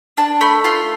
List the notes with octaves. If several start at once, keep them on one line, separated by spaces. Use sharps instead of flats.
D4 A5
A3 B5
F4 C6